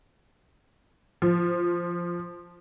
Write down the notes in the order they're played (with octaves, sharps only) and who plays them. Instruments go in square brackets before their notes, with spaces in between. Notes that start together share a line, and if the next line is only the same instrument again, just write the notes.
[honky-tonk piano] F3